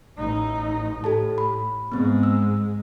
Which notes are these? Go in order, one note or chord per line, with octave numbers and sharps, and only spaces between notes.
A1 D#4
A2 G4 A4 A5
B5
G#2 G#3 B3 C4
E6